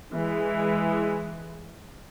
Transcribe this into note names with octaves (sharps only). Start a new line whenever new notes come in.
E3 G#3